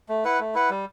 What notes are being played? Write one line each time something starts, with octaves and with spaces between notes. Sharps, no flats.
A3
E4 B4 F#5
A3
E4 B4 F#5
G3